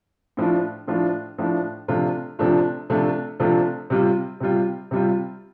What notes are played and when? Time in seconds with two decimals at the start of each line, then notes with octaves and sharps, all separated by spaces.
0.37 A2 F3 D4 F4
0.88 A2 F3 D4 F4
1.38 A2 F3 D4 F4
1.88 C3 F3 A3 D4 F4
2.39 C3 F3 A3 D4 F4
2.90 C3 F3 A3 D4 F4
3.40 C3 F3 A3 D4 F4
3.90 C3 G3 F4
4.40 C3 G3 F4
4.91 C3 G3 F4